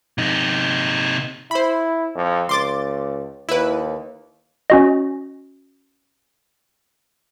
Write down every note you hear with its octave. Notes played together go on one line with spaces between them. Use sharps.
C3 D#4
E4 C5 B5
F2
C#2 C6 D6 A6
D#2 E4 B4
C#4 F#4 D#5